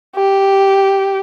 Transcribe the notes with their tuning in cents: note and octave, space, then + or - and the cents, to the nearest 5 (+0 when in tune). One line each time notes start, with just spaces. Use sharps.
G4 -5